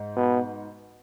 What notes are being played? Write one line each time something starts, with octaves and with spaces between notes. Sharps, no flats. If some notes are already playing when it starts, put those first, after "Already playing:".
Already playing: G#2
B2